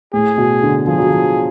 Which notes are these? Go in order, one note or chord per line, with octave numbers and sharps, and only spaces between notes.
A2 G#4
B2
D3
F3 G#4
F#3
F3